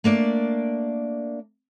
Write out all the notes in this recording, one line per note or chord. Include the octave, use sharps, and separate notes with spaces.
A3 A#3 D4 D5